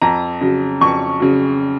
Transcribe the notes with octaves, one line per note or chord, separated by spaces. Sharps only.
F2 A#5
C#3 F#3
F2 C#6
C#3 F#3